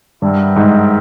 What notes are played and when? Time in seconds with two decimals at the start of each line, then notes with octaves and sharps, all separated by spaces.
0.22 G2 B3 E4 A#4 E5 G5
0.56 G#2